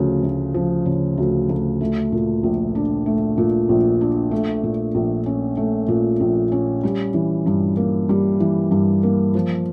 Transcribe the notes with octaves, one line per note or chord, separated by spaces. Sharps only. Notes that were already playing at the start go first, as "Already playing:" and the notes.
Already playing: D2 C#3 F3
D2
F3
C#3
D2
D2
A3
A#2
A#1
D4
A3
A#2
A#1
D4
A3
A#2
A#1
C#4
A3
A#2
A#1
C#4
G3
E3
G2
A#3
G3
E3
G2
A#3
F3